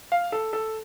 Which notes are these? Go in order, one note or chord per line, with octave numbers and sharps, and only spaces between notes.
F5
A4
A4